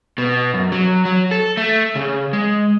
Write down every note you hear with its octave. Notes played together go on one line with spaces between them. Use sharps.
B2
F#2
F#3
F#3
A4
A3
C#3
G#3